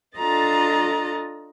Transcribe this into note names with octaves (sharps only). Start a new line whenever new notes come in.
D4 F4 A4 D#5 A#5 A6